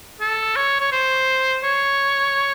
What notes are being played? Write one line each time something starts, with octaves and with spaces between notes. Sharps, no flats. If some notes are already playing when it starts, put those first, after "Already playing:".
A4
C#5
C#5
C5
C#5